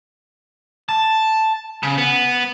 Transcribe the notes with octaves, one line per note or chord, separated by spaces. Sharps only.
A5
C#3
B3